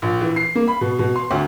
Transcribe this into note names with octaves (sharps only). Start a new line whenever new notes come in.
A#1
E3
C7
A#3
B5
B2
B2
C6
D2